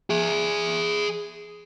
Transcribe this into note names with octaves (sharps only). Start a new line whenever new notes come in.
G#4 E5